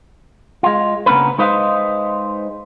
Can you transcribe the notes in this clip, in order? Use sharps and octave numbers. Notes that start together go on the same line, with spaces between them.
G#3 F4
C#3 A#3 B3 C#4 D4 B4
G#3 D#4 B4 C5 D#5 F5